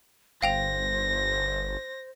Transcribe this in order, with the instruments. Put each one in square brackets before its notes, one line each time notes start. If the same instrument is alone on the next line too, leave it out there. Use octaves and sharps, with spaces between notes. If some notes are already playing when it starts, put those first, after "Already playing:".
[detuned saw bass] G1 [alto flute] C5 [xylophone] F5 G5 F7 [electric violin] A#6